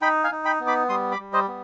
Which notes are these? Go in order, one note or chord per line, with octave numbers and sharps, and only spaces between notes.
D#4 G5 B5
F5 G#5
D#4
G5 B5
B3
B5 D6
G3 C6 D#6
B5 D6
G3
C5 D#5
B3